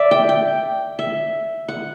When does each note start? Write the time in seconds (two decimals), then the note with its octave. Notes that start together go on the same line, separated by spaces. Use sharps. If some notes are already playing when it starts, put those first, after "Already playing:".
Already playing: D5 E5
0.11 G5
0.29 G5
0.99 E5
1.68 F#5